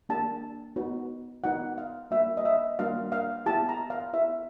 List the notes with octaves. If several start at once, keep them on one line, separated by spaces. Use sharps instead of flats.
A#3 D4 G4 A5
B3 D#4 F#4
B3 D#4 F#4 F#5
F5
G3 A#3 D4 F#4 E5
D#5
E5
G3 A#3 D4 F#4 F5
F5
B3 E4 G4 A5
A#5
F5
B3 E4 G4 E5